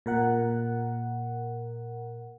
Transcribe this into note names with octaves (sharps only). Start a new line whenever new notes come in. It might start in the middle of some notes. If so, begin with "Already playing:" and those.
A#2 A#4 F#5